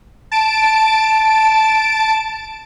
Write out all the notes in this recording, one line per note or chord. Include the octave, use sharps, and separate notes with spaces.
A5 D7